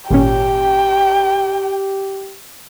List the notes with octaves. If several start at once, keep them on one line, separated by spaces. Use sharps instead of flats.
G#1 A#2 C#4 G4 G5